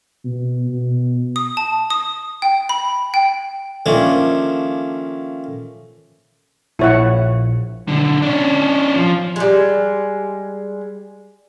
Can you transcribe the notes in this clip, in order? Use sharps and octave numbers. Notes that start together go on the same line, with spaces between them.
B2
B2
D#6
A5
D#6
G5
B5
G5
D#3 F3 A3 A#3 C#4 D4
A#1 E4 C#5 F#5
B1 D3
C#4 D4
F3
G3 G#3